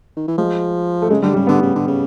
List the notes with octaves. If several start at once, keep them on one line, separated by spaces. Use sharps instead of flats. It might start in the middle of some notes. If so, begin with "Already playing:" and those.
D#3
E3
F3 G#3
A3
C#3 G#3
D3 G3
C#3 G3
D3 B3
C#3
D3
C#3